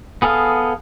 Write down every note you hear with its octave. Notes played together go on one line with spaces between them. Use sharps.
B3 G#4 A4 F5